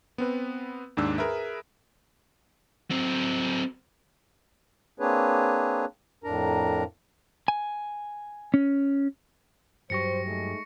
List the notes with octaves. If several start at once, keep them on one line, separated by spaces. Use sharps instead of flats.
B3 C4 B4
D#2 G#2 D4 E6
G#4 A#4 B4 E5
F#3 C4
A#3 C4 D4 G#4 B4 C#5
F2 A2 D4 A#4 A#5
G#5
C#4
G2 F#3 G4 C5 C#6 A#6 C#7
G#3 A3 D#4